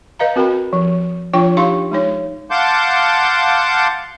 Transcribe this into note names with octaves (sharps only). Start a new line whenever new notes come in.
B4 D#5 F5 A#5
C4 F#4 A#4 G5 B5
F3
F3 D4 F4 C#5 G5
D4 D#4 G4 F5 C6 C#6
G#3 D#4 C#5
F5 F#5 A5 C6 D6 G6